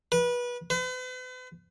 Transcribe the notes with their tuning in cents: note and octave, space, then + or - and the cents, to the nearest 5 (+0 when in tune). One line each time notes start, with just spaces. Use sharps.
B4 -25
B4 +45